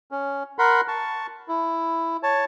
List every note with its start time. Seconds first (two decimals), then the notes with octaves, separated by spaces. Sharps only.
0.11 C#4
0.59 A#4 F#5 B5 C6
0.88 A5 C#6
1.48 E4
2.23 C#5 A5